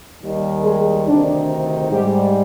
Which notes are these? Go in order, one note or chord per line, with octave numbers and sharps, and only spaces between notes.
D#2 D#3 G3
G#3
D2 C3 D#3 D4
G#2 G3 G4